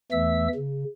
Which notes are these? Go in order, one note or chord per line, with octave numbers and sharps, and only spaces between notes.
E2 E3 A3 E5 E6
C#3